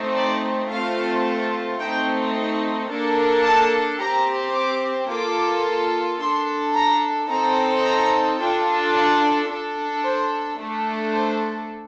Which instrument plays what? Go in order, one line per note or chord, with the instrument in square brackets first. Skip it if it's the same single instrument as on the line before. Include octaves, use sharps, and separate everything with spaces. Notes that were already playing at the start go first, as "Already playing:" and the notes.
Already playing: [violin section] A3 C4 D#4
D5
A3 C4 F4 A4 F5
A3 C4 D#4 G5
A#3 D4 A4
A5
C4 G4 A#5
D6
A#3 F4 A4 D6
D4 A4 C6
A#5
C4 D#4 A4 A#5
A#5
D4 F4 A4 G5
D5
D4 A4
C5
A3 D4 A4
C5